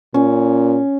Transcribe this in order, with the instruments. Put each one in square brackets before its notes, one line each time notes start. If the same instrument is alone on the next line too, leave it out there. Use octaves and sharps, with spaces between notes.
[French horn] A#2 [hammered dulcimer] C#4